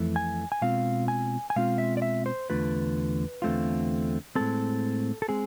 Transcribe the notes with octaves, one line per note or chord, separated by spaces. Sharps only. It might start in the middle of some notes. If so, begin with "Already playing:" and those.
Already playing: F2 E3 A3
G#5
G#5
B2 G#3 C4 F4 F5
G#5
G#5
B2 G#3 C4 F4 F5
E5
D5
E5
C5
E2 D3 A3 F4 B4
E2 D3 A3 C4 F4
A2 G#3 C4 A4
A4
G#3 C4 G#4